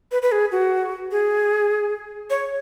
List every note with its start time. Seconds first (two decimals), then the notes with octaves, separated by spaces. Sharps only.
0.12 B4
0.22 B4
0.32 G#4
0.52 F#4
1.11 G#4
2.30 C#5